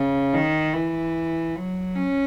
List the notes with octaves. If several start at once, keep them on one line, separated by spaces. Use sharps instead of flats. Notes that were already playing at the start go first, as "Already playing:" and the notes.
Already playing: C#3
D#3
E3
F#3
C#4